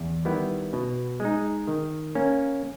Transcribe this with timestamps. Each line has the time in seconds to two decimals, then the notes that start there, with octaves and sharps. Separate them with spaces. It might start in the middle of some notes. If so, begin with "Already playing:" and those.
Already playing: E2
0.25 D#3 G3 B3 E4
0.73 B2
1.20 G#3 D#4
1.67 D#3
2.15 A#3 C#4